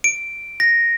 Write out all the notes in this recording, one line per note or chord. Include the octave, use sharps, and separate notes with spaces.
D7
A#6